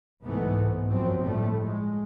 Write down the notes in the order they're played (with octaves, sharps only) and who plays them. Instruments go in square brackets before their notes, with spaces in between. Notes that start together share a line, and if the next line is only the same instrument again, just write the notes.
[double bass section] C2 G#2 E3 A3 B3
G#2
G1 F#2 F3 F#3 C4
A2 F3 G3 A3
G#3